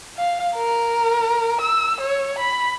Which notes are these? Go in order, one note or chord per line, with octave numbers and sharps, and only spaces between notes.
F5
A#4
E6
C#5
B5